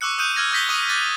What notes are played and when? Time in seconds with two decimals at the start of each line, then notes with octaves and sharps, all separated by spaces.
0.01 C#6 D6 E6 F#6 C#7
0.18 D#6 F#6 G6 D#7
0.36 E6 F6 G#6 A#6
0.51 D#6 G6 A#6 B6 G7
0.69 C#6 D#6 D#7
0.89 D6 F#6 A6 D#7